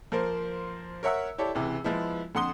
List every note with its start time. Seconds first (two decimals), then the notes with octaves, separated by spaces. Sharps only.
0.12 F3 A#3 A#4 C5
1.03 A#4 C#5 E5 F#5 E6
1.38 E4 G4 A4 C#5 D5
1.55 C#2 C3 E3
1.84 F3 G#3 B3 E4
2.35 F2 D3 F#5 C6 D#6 G7